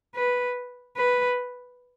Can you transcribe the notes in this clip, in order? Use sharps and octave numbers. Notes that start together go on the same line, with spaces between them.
B4
B4